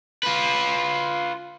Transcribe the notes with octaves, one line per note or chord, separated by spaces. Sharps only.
F4 B4